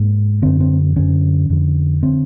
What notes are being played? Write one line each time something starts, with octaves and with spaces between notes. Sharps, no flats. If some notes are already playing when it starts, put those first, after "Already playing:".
Already playing: G#2 A#3
F#2 D3 C4
C4
F#2 D3 C#4
F2 D3
D3 C4